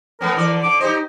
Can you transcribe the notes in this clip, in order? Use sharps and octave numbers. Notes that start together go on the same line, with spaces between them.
A3 B3 C#4 A#4
D3 E3 D5
D3 D6
D#4 G4 C5 D#5